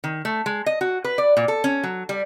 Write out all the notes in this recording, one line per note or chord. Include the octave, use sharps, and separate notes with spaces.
D#3
A3
G#3
D#5
F#4
B4
D5
A#2
A4
C#4
F#3
G3